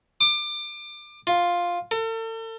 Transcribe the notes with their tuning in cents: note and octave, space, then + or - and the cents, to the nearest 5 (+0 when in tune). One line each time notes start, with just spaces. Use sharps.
D6 +25
F4 +5
A4 +40